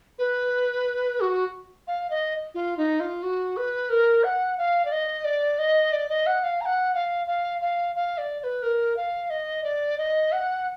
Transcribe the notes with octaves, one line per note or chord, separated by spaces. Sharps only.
B4
F#4
F5
D#5
F4
D#4
F4
F#4
B4
A#4
F#5
F5
D5
D#5
D5
D#5
D5
D#5
F#5
F5
A#5
F#5
F5
F5
F5
F5
D5
D5
B4
A#4
F5
D#5
D5
D#5
F#5